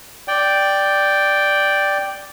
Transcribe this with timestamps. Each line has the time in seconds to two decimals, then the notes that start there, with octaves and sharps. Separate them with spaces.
0.28 D5 G5